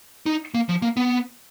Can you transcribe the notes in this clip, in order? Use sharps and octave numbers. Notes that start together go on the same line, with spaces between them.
D#4
A#3
F3
A#3
B3